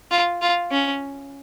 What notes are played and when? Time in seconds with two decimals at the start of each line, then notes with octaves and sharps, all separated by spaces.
0.11 F4
0.42 F4
0.72 C#4